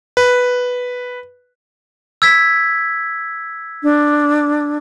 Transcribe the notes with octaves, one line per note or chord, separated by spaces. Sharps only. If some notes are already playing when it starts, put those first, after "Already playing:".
B4
E6 G#6 B6
D4